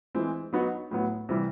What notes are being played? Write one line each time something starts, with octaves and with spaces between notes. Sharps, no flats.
E3 G#3 C4
F#3 B3 D#4 F#4
A2 F#3 B3
C3 E3 G3